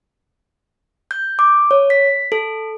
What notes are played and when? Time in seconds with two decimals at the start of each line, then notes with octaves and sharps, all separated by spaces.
1.11 G6
1.39 D6
1.71 C#5
1.90 B6
2.32 A4